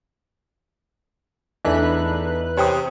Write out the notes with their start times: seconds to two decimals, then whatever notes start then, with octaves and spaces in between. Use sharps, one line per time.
1.65 E2 E3 A3 D4 D#4 B4 F#6
2.57 C3 C#5 G5 D#6